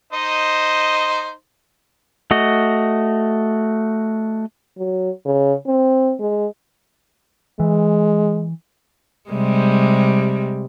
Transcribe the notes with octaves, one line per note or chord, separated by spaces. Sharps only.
D#4 C5 D#5
A3 F#4 D#5
F#3
C#3
C4
G#3
E3 G#3
C3 G3 G#3